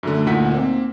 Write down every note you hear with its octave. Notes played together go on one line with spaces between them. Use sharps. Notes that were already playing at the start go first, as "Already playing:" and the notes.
F#2 D3 A3
D2 A#2 D#4 F#5 B6
A#3 C4